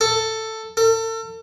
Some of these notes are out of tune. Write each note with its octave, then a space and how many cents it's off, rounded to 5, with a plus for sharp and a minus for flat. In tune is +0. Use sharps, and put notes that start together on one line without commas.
A4 +10
A4 +40